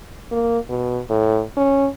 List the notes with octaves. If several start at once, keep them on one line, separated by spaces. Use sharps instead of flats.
A#3
B2
A2
C#4